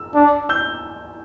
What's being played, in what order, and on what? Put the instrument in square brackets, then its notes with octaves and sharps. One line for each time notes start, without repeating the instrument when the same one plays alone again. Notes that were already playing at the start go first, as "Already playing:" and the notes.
Already playing: [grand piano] E6
[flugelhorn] D4
[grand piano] E6 G6